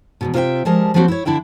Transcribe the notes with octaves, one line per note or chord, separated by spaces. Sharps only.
E2 G#2 B2
C3 F4 A#4 C#5 E5 G5
F3 G3 G#3 A#4 A5
F3 F#3 A#3 C4 F#4 G4
E4 C#5
D3 D4 E4 E5 G5